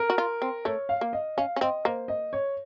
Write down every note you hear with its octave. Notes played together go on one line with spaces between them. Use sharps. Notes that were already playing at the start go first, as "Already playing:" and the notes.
Already playing: A#4
F#4
F4
C4
A3 C#5
F5
A#3
D#5
C#4 F5
C#4
C4 D#5
A#3 C5
D#5
C#5